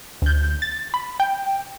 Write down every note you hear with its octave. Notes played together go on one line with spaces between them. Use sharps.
D2 G6
A6
B5
G5